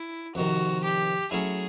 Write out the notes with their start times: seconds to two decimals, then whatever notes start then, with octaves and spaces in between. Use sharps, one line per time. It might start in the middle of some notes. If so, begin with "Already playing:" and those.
Already playing: E4
0.35 F2 C3 D#3 F#4
0.84 G4
1.31 F#3 A3 C#4 E4 G#4